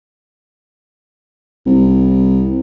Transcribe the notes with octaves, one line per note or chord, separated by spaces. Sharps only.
C2